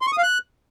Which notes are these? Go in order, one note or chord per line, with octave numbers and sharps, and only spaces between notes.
C6
C#6
D#6
F5
F#6